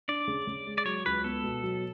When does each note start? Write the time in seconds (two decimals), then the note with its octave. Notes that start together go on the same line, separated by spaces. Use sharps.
0.08 D4 D5
0.28 C#3
0.47 C#3
0.66 G#3
0.78 D5
0.85 F#3 C#5
1.05 C#2 B4
1.24 B3 A4
1.44 B2
1.63 F#3